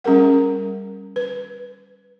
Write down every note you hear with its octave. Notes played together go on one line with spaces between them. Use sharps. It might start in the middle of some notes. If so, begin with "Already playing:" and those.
G3 C#4 G#4 A#4 F#5
B4